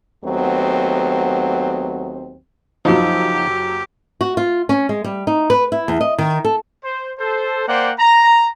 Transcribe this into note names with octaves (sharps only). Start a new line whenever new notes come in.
D#2 F#3 A3 B3 C4
F#1 F3 F#3 D#4 G4
F#4
F4
C#4
G#3
G3
D#4
B4
E4
E2
D#5
D#3
A4
C5
A4 C5
A#3 C5 D5 F#5 G5
A#5